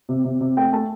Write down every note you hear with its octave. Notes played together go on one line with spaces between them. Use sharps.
C3
C3
C3
A3 G5
A3 A5